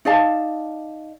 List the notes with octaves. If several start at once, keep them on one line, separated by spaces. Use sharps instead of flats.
D#4 D5 F5 A5